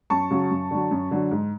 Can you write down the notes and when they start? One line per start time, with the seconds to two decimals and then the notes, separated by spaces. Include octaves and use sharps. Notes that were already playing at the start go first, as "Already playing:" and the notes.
0.10 F#2 A5 C#6
0.31 C#3 F#3
0.51 F#2
0.71 D3 F#3
0.91 F#2
1.11 D3 F#3
1.31 G#2